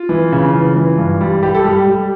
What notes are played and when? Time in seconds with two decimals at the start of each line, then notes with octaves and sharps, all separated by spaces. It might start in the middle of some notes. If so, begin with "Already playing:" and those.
Already playing: F4
0.09 E3
0.32 C#3
0.54 E3
0.76 E3
0.98 G2
1.21 G3
1.43 G3 G4
1.55 A4
1.64 G3 G4
1.87 G3